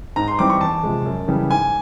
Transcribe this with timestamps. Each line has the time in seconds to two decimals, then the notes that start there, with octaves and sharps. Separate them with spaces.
0.16 G#2 A#5
0.28 C6
0.39 E3 G3 C4 D#4 D6
0.50 C#6
0.61 E2 A5
0.83 C3 F3 G#3
1.06 F#2
1.28 C#3 E3 G3
1.50 G#2 G#5